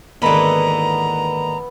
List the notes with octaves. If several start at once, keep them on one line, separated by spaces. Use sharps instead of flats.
D#2 G#2 D3 E3 B3 A#5